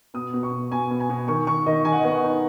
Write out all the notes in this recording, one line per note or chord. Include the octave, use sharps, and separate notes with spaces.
B2 D#6
B2
C#6
B2
B2 G#5
B2
G#5
B2
D#3 C#6
D#3 C#6
D#3 D#5
D#3 G#5
F#5
D#5
B3 F#5
D#4